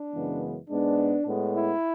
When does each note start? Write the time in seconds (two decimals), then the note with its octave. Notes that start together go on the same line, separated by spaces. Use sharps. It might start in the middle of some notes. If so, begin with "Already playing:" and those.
Already playing: D4
0.12 F#2 C#3 E3 G#3 B3
0.70 G#2 G#3 B3 D4
1.26 A2 G#3 B3
1.55 E4